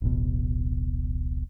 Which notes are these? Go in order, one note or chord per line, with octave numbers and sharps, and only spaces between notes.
D1 A1 B2